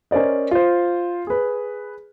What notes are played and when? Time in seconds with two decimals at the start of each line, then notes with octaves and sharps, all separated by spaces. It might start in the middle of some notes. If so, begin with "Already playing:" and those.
0.11 C#4 A#4 C5 D5 D#5
0.51 F4 C5
1.27 G#4 B4